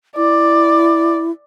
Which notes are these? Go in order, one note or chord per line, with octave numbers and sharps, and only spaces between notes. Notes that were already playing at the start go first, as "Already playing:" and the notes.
E4 D5